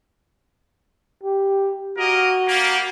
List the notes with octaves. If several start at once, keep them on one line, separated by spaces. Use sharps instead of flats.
G4
A#3 F#4 A#4 D#5
G3 A#3